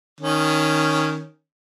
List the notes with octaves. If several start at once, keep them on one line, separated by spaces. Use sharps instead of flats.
D#3 C#4